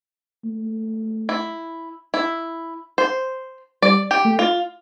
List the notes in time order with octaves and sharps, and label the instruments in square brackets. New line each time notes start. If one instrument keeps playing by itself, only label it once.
[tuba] A3
[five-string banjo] E4
E4
C5
[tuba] G3 [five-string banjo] D5
[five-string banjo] G4
[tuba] A3
[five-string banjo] F4